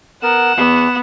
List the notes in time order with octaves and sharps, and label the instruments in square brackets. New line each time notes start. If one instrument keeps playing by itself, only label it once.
[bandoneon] B3 A#4 [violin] F#5 E7
[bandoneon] E2 [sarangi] B3